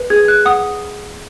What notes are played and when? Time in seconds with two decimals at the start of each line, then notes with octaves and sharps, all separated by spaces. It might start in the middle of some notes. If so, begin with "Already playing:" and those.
Already playing: B4
0.10 G#4 G#6
0.28 F#6
0.45 F#5 D#6